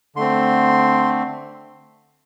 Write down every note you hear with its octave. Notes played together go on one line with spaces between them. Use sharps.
D3 A3 C4 C6